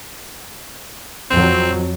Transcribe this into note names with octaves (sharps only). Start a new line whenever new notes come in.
F2 F#3 C4